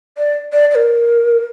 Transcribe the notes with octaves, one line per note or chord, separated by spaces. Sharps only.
D5
D5
D5
A#4